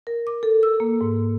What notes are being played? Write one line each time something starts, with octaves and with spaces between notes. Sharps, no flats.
A#4
D6
A4
E6
A#3
G#2